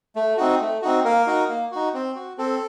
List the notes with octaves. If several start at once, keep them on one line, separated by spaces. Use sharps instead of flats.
A3
C4 D#4 F#4
A3
C4 D#4 F#4
A#3 A#4
D#4 F#4
A#3
D#4 F#4
C4
F#4
C4 A4